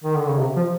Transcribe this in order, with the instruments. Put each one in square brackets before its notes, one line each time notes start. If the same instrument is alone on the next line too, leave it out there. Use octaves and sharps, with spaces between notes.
[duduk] D#3
D3
C#3
C3
F3